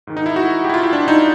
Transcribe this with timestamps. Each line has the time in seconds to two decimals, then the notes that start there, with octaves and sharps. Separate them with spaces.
0.07 G#2 D#3
0.17 D#4
0.26 E4
0.36 F#4
0.64 G4
0.69 E4
0.74 F4
0.83 E4
0.93 D4
1.08 D#4